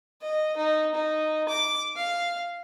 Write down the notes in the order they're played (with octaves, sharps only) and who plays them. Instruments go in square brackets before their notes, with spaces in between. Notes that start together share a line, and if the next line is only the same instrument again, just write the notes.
[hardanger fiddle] D#5
D#4
D#4
D6
F5